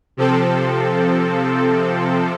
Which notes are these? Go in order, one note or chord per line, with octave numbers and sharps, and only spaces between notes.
C3 F3 C4 A4